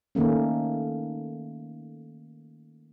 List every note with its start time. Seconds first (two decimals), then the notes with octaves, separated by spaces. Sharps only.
0.15 D#3 A3 A#3 C#4